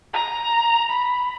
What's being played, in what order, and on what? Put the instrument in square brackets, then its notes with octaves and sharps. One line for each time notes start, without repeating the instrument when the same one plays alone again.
[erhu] A#5
B5